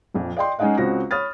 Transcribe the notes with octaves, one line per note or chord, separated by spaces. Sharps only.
A#1 F2
D5 D#5 G5 C6
G#3 C#4 D#4 G#4 D#5 F#5
C#2 G#3 C4 F#4 A#6
C#5 B5 D#6 F6 A6